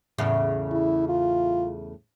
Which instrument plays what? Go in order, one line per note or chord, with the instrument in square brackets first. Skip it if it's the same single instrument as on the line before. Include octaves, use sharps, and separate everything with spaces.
[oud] E2 A2 C#3
[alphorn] E4
F4